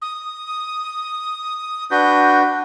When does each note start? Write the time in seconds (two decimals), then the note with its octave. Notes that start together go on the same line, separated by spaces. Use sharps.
0.02 D#6
1.91 D4 F#4 B4 G6